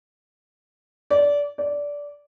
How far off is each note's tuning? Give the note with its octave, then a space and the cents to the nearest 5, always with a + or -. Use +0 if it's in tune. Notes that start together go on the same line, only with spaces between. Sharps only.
D5 -20
D5 -15